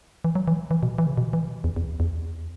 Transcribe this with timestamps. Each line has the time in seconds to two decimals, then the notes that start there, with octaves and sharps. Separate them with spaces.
0.24 E3
0.35 F#3
0.48 E3
0.71 E3
0.83 B2
0.98 E3
1.07 C#3
1.17 B2
1.33 E3
1.64 E2
1.76 E2
2.00 E2